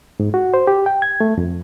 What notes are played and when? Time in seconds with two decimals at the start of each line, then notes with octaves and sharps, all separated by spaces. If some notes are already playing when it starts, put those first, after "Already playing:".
0.20 G#2
0.34 F#4
0.54 C5
0.67 G4
0.86 G5
1.02 G#6
1.21 A3
1.38 F2